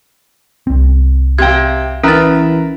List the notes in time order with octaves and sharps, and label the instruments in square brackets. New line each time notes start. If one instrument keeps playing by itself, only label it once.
[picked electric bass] C2 C4
[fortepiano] C3 G5 [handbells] F5 G#6
[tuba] E3 [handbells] C#4 A6 [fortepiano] A#4 B4 E5